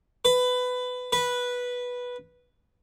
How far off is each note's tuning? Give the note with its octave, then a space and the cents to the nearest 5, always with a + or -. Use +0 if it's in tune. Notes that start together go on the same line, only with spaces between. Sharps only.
B4 +15
B4 -10